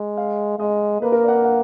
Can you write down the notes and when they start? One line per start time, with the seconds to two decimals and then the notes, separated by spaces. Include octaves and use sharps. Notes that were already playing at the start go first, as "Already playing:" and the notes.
Already playing: G#3
0.17 F5
0.59 G#3 D#5
1.02 A#3 B4
1.12 A#4
1.23 D5
1.28 F#5
1.33 F5
1.44 F#5